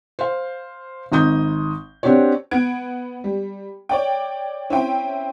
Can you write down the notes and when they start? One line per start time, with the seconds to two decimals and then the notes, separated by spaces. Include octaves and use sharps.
0.19 C5 F5
1.12 G#1 D#4 D#6 G6
2.03 C4 D4 F#4 G4 C#5
2.51 B3 F#5 G#6 D7
3.24 G3
3.89 C#5 D5 G5
4.70 C4 C#4 E4 C5 E5 G5